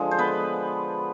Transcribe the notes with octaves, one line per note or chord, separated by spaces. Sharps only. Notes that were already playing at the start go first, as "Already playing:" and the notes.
Already playing: D3 F3 G#3
C5
B3 B4